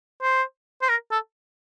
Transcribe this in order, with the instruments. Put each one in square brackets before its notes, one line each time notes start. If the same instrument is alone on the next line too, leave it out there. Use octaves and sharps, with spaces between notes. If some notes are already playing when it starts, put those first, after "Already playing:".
[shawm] C5
C5
A#4
A4